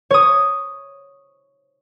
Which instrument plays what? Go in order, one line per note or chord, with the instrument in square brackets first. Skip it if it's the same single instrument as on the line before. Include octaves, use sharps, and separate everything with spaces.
[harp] C#5 D#6